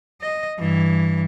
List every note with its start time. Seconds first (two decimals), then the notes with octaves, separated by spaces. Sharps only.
0.21 D#5
0.58 G2 E3